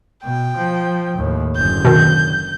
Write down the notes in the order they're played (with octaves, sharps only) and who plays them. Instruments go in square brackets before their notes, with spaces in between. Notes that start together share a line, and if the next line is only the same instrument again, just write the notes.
[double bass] B2 [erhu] G5
[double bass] F3
D#2 A2
[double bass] F#1 D3 [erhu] G6
[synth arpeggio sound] B2 D#3